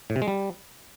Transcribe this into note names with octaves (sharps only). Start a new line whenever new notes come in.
A2
C3
G#3
G3